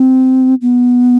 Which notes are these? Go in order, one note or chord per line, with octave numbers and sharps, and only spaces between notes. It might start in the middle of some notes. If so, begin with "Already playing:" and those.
Already playing: C4
B3